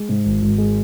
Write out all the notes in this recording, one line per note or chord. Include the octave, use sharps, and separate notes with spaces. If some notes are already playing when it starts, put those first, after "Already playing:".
Already playing: G#3
G#2
G#1
G#1
G#3